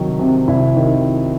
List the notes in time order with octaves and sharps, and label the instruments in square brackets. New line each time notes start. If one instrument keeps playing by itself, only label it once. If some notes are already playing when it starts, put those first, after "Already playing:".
Already playing: [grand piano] C2 D#3 F#3
C3
C2 E4
D#3